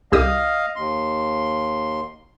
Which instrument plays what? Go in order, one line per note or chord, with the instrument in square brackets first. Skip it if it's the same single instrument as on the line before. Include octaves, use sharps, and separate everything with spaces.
[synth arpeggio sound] C2 G4 D#6 [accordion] D#5 F5
[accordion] D#2 C6